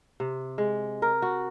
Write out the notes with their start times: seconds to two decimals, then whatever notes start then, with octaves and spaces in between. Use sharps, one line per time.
0.20 C3
0.58 G#3
1.02 A#4
1.22 F#4